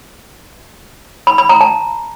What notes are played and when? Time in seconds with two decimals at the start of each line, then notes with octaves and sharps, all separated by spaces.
1.27 B5
1.38 B5
1.49 A#5
1.61 A5